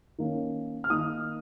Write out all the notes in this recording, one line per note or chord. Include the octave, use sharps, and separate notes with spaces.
D#3 A#3 C#4
F6
D#3 A#3 D#4 D#6